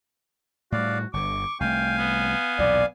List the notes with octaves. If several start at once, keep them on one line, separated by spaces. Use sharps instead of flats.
A2 G3 F#4 D5 F5
G1 D3 C#6 D6
C2 A3 F5 G5 G#5
B3
B1 E2 A#2 D5